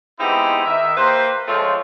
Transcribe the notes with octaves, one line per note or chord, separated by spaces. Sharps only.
G#3 B3 C4 D#4 E4 G4
D#3 E5
A#3 G4 B4 C5
F3 G#3 A3 C4 F4 C#5